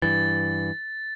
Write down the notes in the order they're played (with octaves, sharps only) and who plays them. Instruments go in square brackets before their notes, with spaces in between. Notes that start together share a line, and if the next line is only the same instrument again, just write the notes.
[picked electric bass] G2 E3 [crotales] A6